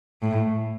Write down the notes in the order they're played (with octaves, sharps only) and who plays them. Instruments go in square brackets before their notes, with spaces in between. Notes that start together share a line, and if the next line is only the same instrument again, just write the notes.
[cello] A2